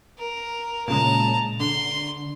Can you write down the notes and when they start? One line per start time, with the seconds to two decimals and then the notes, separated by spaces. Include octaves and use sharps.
0.19 A#4
0.88 A#2 C#3 G#3 A5 A#5
1.60 D3 C6